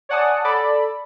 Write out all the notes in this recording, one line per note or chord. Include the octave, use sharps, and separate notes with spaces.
C#5 D5 F#5 G#5 A5 D#6
A4 D5 B5